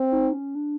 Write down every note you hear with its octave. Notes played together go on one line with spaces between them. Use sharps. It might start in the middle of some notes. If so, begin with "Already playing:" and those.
Already playing: C4
D#4
C#4
D4